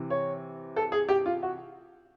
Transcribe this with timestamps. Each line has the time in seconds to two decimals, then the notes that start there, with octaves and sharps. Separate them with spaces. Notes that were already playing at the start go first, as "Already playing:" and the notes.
Already playing: C3 E3
0.10 C#5
0.76 A4
0.92 G#4
1.09 G4
1.26 F4
1.43 F#4